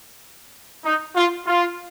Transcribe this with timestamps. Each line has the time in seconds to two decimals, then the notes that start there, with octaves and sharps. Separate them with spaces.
0.85 D#4
1.15 F4
1.46 F4